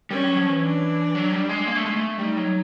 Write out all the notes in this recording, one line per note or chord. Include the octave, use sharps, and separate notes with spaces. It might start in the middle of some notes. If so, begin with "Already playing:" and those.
G3 C#4
F#3
F3
E3
D4
F#3
G3
G#3
A#3
A3
G#3
A3
G3 D#4
F#3